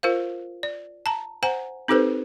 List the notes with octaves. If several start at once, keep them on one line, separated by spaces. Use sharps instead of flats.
F4 A#4 C5 F5
D5
A5 A#5
C5 F#5 G#5 A#5
C4 D#4 G4 A4 B4 C5